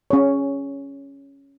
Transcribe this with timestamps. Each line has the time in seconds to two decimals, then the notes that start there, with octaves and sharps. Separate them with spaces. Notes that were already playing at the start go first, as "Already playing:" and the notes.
0.10 C#4 G#4 C#5